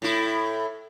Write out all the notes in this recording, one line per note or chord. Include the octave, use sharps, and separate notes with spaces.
A2 E4